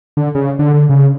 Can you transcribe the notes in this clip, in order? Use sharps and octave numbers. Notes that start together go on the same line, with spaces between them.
D3
C#3
D3
D3
C#3